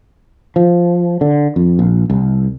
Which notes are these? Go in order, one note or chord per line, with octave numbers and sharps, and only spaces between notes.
F3
D3
F2
A#1
C2